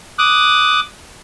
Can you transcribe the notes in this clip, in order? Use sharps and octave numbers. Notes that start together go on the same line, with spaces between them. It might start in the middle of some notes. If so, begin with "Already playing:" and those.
D6 D#6 F#6